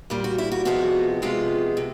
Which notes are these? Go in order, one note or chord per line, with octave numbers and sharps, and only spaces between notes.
A#2 G3 A#3
F#4
E4
F#4
C3 F3 G#3 B3 F#4
C3 F3 G#3 B3 F4
C3